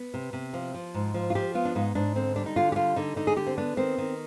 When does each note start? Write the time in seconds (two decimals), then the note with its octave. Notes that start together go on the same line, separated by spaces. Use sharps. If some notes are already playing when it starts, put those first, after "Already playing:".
Already playing: B3
0.14 C3
0.33 C3
0.53 F3
0.74 F3
0.94 G#2
1.14 F3
1.30 F4
1.35 F3 G4
1.55 B3 F4
1.65 D4
1.75 G#2 D#4
1.95 G#2 D4
2.16 D3 C4
2.36 G3 D4
2.46 D#4
2.56 D3 F4
2.72 G4
2.76 G3 F4
2.96 D3 D#4
3.16 D3 D#4
3.27 G#4
3.37 D3 G4
3.47 C4
3.58 B3 D4
3.77 D#3 C4
3.98 D#3